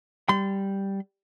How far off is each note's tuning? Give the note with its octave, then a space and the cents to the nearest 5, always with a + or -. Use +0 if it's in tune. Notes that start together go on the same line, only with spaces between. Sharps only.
G3 +0 C6 -35